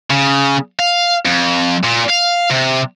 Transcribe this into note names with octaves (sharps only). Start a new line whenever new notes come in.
C#3
F5
F2
A#2
F5
C3